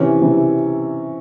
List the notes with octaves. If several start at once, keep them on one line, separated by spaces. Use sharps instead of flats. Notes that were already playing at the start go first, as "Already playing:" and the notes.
Already playing: C3 E3 C#4
C3 E3